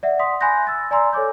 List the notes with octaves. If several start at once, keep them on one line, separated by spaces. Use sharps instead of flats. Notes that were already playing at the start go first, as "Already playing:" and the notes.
D5 E5 F#5
C6 D#6 B6
G#5 B5 C6 F#6 G6 A#6
E6 A6
D5 G#5 A#5 C6 E6
A4 C#5 G#5 D6 G6